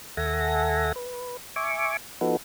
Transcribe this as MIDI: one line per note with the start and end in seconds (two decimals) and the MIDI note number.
0.17 0.92 39
0.17 0.92 69
0.17 0.92 76
0.17 0.92 78
0.17 0.92 80
0.17 0.92 94
0.96 1.37 71
1.56 1.97 76
1.56 1.97 80
1.56 1.97 85
1.56 1.97 86
2.21 2.37 53
2.21 2.37 59
2.21 2.37 63
2.21 2.37 66
2.21 2.37 69
2.21 2.37 71